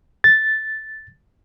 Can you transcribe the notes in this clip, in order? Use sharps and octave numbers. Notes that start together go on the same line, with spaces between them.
A6